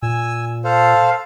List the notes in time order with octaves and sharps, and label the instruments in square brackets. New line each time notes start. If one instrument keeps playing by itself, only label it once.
[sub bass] A#2 [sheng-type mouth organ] G#5 E6
[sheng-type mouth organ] A4 C5 F5